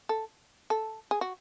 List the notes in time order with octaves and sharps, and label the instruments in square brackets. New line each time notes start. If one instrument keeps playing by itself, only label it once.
[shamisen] A4
A4
G#4
F#4